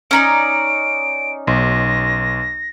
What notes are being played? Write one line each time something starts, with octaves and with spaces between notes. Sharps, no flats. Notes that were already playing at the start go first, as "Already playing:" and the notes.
C#4 D#4 D5 D7
B1 A#6